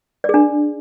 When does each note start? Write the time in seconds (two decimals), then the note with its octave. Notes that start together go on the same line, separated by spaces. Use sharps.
0.24 D5
0.29 G#4
0.34 D4